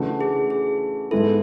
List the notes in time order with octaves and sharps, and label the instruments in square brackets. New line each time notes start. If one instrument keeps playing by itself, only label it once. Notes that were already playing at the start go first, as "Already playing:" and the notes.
Already playing: [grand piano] C#3 E3 A3 D4 F#4
[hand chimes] G#4
G#4
[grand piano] G#2 G#3 B3 E4 [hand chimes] A4